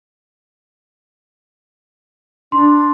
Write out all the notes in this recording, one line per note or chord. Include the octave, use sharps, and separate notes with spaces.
D4 C6